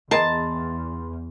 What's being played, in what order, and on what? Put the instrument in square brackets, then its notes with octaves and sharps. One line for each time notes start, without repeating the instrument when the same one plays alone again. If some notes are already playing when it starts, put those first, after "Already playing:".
[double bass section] E2 [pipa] G#4 A#4 D#5 [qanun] A5 [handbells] B5 C6